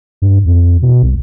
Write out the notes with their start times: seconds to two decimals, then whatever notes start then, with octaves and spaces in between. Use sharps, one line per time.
0.22 G2
0.45 F2
0.82 B2
1.03 C2